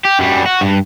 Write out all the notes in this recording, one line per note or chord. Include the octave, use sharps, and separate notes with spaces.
G4
F#2 G3
F#4
G2